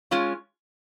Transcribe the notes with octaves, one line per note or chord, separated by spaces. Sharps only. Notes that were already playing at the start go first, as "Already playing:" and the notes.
G#3 C#4 F4